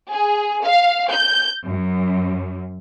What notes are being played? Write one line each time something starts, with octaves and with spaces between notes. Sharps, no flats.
G#4
F5
G6
F#2